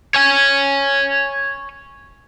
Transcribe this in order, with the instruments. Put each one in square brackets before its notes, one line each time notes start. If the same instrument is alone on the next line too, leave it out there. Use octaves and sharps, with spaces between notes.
[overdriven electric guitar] C#5 G#5